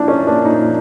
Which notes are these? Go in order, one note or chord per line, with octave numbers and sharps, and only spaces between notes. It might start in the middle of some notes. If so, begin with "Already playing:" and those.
Already playing: A#2 F3 A#3 D4 E4
C#4
D4
D#4